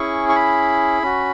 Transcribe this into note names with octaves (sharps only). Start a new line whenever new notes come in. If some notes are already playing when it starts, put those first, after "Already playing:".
Already playing: C#4 E4 G#4 C#6
C#6
B5
C#4 F#4